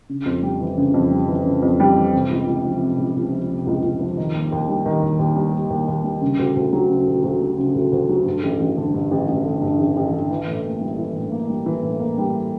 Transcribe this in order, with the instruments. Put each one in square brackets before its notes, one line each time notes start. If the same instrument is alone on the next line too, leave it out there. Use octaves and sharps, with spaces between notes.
[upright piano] C#3
F2
G3
E3
C#3
F2
G3
E3
C#3
F2
G3
E3
C3
C#2
C#2
F3
C3
C#2
C#2
F3
C3
C#2
C#2
F3
D#3
D#2
D#2
G3
D#3
D#2
D#2
G3
D#3
D#2
D#2
G3
C#3
D2
D2
F#3
C#3
D2
D2
F#3
C#3
D2
D2
F#3
G2
A1
A1
D3
G2
A1
A1
D3
G2
A1
A1
D3
E3
A2
A#3
G3
E3
A2
A#3
G3
E3
A2
A#3
G3